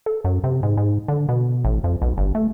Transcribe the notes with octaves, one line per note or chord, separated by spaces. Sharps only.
A4
F#2
C3
G#2
G#2
D3
B2
A1
F2
B1
G1
A3